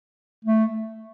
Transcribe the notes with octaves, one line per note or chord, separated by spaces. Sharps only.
A3